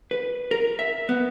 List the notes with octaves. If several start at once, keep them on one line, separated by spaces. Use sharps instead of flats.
B4
A#4
E5
B3